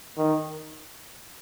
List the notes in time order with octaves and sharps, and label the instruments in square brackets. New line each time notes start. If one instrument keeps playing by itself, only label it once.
[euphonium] D#3